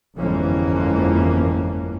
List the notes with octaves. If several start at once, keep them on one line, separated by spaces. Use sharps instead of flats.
G1 F2 G#2 E3 A#3 C#4